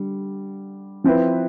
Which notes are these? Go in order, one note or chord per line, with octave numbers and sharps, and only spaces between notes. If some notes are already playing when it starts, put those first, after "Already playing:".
Already playing: D3 G3
F3 C4 E4 B4